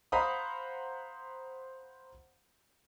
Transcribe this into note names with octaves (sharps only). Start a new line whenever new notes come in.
C5 F5 F#5 A#5 B5 D#6